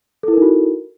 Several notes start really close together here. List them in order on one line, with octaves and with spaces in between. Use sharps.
A4 E4 A#4 D#4 F#4